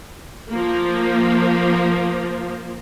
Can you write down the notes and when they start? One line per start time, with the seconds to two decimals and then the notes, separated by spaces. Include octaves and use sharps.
0.50 F3 A#3